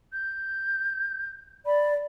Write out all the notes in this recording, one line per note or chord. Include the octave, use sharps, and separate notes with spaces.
G6
D5 B5